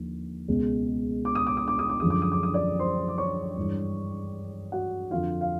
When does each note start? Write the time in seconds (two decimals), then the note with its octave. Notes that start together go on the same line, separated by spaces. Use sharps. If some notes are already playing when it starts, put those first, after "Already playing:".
Already playing: D#2 D3 F3
0.48 C#2 B2 G#3
1.25 D6
1.35 D#6
1.47 D6
1.57 D#6
1.68 D6
1.79 D#6
1.89 D6
2.00 F#2 D3 F3 G#3 D#6
2.10 D6
2.22 D#6
2.32 D6
2.43 D#6
2.54 D5 D6
2.79 C5 C6
3.08 D6
3.18 C#5 C#6
3.57 G2 E3 G#3
4.72 F#4 F#5
5.11 F2 D3 F3 F4 F5
5.41 F5